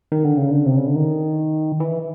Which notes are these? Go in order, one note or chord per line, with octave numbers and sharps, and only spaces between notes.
D#3
D3
C#3
D3
C3
C#3
D3
D#3
E3